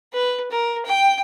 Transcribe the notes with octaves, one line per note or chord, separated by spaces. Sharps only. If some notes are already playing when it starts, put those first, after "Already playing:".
B4
A#4
G5